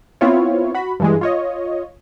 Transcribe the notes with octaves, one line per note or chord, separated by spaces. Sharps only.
B3 C4 E4 F4 C#5
F#4 B5
G2 E3 G#3
F4 C#5 D#5